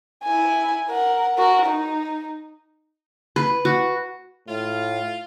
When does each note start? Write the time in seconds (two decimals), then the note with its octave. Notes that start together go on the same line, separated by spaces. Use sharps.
0.24 E4 G#5
0.88 A#4 F#5
1.36 F#4 A#4
1.66 D#4
3.36 B4
3.65 F#4
4.49 A2 F4